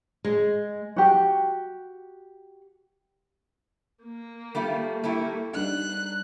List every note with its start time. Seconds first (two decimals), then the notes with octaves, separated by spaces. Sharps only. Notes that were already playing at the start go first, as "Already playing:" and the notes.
0.25 G#3
0.96 F#4 G4
4.03 A#3
4.55 G3 A3 F4
5.03 G3 A3 A#3 E4
5.54 G3 D4 D#4 F#6